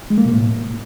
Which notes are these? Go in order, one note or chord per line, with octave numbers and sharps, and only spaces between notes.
G#3
A#3
B2
A2